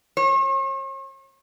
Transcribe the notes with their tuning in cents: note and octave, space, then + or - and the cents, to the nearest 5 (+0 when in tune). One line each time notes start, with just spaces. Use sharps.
C#5 -45